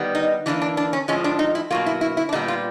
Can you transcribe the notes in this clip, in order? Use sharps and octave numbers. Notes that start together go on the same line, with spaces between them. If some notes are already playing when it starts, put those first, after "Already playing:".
Already playing: D#3 G3 B3
D#4
E3 G3 A#3 D4
D4
D4
C#4
A2 F3 G#3 C#4
D4
D#4
E4
B2 F#3 A#3 F4
E4
E4
E4
D4
A#2 G3 B3 D#4
F4